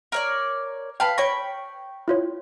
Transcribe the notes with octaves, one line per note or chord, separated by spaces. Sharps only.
A#4 C#5 D5
B4 F5 G5 A5
C#5 G5 B5 C#6 A#6
E4 F4 C#5